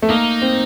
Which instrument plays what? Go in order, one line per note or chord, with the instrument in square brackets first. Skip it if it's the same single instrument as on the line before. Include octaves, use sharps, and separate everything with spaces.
[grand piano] A3
[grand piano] A#3 [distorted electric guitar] D#4
[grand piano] C4